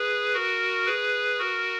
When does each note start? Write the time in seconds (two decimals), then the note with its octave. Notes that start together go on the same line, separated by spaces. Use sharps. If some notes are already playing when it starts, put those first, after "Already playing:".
Already playing: G#4 B4
0.34 F#4 A#4
0.86 G#4 B4
1.39 F#4 A#4